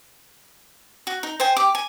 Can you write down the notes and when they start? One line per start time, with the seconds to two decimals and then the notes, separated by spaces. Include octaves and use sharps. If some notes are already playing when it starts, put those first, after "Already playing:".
1.07 F#4
1.23 D#4
1.40 C5 G5 G#5
1.57 G4 D6
1.75 G#5